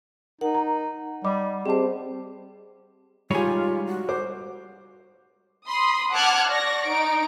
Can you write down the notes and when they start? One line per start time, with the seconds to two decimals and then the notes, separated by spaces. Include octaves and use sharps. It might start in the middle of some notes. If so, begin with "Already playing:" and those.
0.41 D#4 A#4 F#5
0.55 A#5
1.24 G3 D#5 B5 D6
1.66 C4 G4 G#4 C5 D#5 A5
3.31 G3 G#3 D#4 F4 G4 C#5 G#5 B5
3.87 F#4
4.09 C5 D6
5.67 B5 C6 D#6
6.13 F#5 A5 D6 F6 F#6 G#6
6.48 D5 C#6 A#6
6.87 D#4 D7